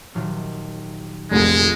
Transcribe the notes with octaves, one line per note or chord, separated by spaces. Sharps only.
D#1 F#3 F6
F1 A#1 G#3 F4 G#4 A4